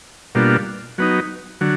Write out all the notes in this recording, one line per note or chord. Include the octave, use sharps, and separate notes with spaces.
B2 G3 A#3 D4 F4
F#3 B3 D#4
D3 F#3